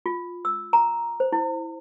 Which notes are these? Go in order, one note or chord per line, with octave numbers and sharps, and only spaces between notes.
F4
E6
A#5
C5
E4